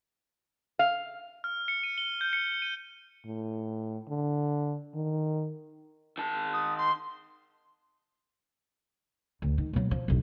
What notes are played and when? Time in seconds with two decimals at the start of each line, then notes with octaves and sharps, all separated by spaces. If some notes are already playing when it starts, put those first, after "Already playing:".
0.79 F5
1.44 F6
1.68 C#7
1.83 D#7
1.98 G7
2.21 G6
2.33 C#7
2.62 D#7
3.26 A2
4.09 D3
4.95 D#3
6.18 D#3 A5
6.54 D#6
6.78 C6
9.42 D2
9.58 D#3
9.73 B2 F#3
9.91 F3
10.08 E1 B1